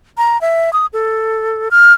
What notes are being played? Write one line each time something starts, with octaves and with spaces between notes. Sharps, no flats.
A#5
E5
D#6
A4
F6